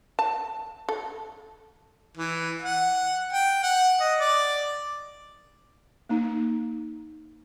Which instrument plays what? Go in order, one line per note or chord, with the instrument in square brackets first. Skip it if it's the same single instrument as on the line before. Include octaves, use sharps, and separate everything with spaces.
[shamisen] A5
A4
[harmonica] E3
F#5
G5
F#5
D#5
D5
[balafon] A#3 D#4